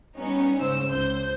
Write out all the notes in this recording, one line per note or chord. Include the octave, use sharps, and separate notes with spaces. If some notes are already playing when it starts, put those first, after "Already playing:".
G3 B3 C#4 D#4
G#2 C#3 C5 E6
C#2 C5 G6